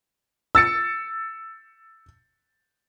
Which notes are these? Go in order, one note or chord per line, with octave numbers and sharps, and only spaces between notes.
E6 A6 C#7